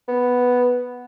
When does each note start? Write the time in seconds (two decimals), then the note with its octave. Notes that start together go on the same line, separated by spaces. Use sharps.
0.08 B3